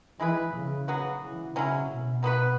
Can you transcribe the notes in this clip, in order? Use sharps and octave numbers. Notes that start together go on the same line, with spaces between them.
E3 G#3 E4 G#4 B4
C#3
F#3 B3 F#4
E3
C#3 F#3 C#4 E4
B2
F#3 B3 F#4 B4